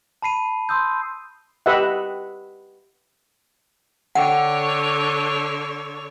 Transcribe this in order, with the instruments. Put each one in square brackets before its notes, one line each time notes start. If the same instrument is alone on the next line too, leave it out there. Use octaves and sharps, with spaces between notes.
[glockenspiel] A5 B5 C7 D#7
C6 D#6 E6 G6
[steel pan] G4 B4 D#5 E5 F#5
[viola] D3 C#5 [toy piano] F#5 G5